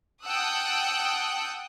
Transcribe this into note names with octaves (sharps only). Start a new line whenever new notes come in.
F#5 G5 A5 D#6 E6 F#6